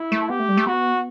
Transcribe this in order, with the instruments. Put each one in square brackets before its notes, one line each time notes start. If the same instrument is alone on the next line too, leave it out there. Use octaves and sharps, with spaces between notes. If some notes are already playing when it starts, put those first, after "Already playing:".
Already playing: [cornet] E4
[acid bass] A3
[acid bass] B3 [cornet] G4
[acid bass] A3
G3
A3
[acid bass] B3 [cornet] F#4